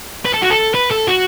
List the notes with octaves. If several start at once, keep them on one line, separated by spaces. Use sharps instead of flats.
B4
A4
F#4
A4
B4
A4
F#4